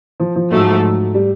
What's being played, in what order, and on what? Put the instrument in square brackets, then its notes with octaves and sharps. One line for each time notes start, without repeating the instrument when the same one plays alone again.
[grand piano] F3
F3
[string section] G#2 F3 A3 [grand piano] F#3
[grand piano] G3